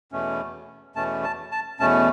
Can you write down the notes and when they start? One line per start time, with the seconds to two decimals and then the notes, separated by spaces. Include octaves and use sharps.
0.12 E2 B2 A3 C#4
0.96 E2 B2 A3 C#4 A5
1.24 A5
1.52 A5
1.79 E2 B2 A3 C#4 A5